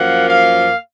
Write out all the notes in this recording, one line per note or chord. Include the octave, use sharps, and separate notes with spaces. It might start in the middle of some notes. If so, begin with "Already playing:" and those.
Already playing: F#2 F3 A#3 F#5
F5